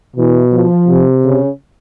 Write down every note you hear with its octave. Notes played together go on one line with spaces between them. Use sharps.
B2 E3
F3
C3
C#3